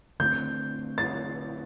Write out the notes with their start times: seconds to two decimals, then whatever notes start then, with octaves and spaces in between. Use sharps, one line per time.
0.20 D3 A3 C4 G6
0.98 A6